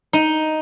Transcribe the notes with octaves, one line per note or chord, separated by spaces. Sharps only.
D#4